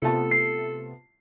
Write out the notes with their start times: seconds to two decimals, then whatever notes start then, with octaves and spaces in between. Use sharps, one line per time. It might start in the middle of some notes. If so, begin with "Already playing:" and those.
0.02 C3 A3 B3 F4 A4 A5
0.31 C7